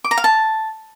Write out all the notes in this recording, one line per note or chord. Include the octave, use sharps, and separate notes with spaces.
D6
A#5
F5
A5